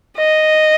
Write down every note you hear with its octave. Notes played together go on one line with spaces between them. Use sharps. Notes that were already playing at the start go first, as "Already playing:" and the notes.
D#5